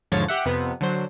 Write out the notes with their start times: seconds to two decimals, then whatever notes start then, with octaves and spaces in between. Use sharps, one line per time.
0.12 E2 G#2 D3 F3 C#5 A6
0.28 G4 E5 F#5
0.46 F2 C3 B3
0.81 D3 F#3 C5